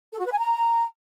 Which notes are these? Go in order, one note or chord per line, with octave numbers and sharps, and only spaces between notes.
A4
F#4
B4
G#5
A#5